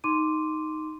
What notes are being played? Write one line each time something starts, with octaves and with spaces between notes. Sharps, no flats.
D#4 C6 D6 D#7